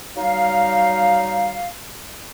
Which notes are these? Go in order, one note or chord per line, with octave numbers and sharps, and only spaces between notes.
F#3 G3 D#4 F5